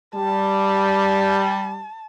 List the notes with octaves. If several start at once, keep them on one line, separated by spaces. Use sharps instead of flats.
G3 A5